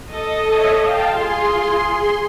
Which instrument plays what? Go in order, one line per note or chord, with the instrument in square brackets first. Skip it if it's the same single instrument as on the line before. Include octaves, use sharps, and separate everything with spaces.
[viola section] A4 D#5
[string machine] C#5 E5
F5 G5 A5
[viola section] F4 [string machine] G#4 C6